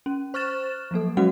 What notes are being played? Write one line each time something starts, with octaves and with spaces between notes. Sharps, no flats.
C#4
C5 C#6 F6 F#6 A6 E7
F3 F#3 A#3 A4
F#3 G#3 C#4 F#4 F#5